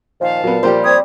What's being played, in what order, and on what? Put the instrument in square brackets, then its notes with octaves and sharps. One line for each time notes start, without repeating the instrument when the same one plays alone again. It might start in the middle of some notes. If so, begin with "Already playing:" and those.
[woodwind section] A#2 D#3 F3 [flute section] F5 A5
[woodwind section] A#2 [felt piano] F#3 B3
[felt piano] F3 A#3 G4 [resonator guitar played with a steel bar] G3 C5
[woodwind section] C4 D5 [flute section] D#6 G#6